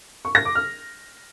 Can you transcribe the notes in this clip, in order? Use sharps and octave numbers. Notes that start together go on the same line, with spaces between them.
C#6
A#6
D6
F6